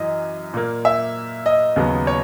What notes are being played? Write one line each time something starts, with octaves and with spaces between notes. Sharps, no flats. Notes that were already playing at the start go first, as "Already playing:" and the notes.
Already playing: F#2 E3 D#5
A#2 A#3
E5
D#5
D#2 C#3 F#3 B3
C#5